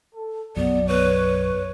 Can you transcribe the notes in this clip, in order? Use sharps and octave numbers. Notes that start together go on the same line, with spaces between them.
A4
B1 F#2 F#3 B3 D5
B4 C#5